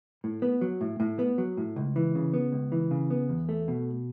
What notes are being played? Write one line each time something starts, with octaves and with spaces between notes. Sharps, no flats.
A2
B3
F#3
A2
A2
B3
F#3
A2
C#2
E3
C#3
B3
C#2
E3
C#3
B3
E2
A3
B2